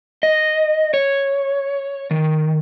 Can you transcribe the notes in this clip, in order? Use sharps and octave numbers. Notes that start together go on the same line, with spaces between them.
D#5
C#5
D#3